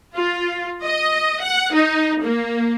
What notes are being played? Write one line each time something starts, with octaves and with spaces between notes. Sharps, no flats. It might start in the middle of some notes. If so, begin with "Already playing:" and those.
F4
D#5
F#5
D#4
A#3